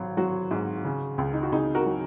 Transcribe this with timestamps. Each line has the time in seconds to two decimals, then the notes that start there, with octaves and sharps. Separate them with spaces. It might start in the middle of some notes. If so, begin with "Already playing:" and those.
Already playing: G#1 F#3
0.17 F#3 F#4
0.51 G#2
0.85 C#3
1.18 C#2
1.33 D#4
1.43 F#4
1.52 C#2 D#4 G#4
1.75 F#4 A#4
1.86 F#3